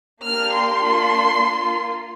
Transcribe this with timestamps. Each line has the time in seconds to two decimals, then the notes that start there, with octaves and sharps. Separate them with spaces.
0.25 A#3 D4 G4 F6
0.54 C6
0.83 A#3 D4 F4
1.40 A#3 F4